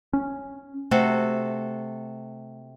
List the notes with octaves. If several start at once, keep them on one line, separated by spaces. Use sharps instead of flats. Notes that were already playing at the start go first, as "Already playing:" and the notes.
C#4
C3 A3 F#4 A4